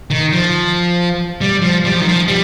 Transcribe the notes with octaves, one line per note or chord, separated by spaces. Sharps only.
D#3
F3
G3
F3
G3
F3
D#3
F3
G3